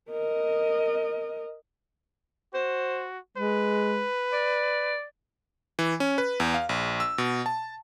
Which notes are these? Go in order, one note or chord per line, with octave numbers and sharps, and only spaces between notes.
A#4 D#5
F#4 C5
G#3 B4
D5
E3
C#4
B4
E2
F5
A#1
E6
B2
A5